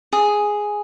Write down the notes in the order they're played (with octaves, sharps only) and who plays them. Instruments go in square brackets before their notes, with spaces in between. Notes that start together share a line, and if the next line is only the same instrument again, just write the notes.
[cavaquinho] G#4